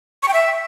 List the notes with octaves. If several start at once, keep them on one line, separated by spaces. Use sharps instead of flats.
C#6
G5
E5